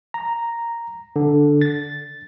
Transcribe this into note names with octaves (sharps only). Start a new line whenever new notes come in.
A#5
D3
A6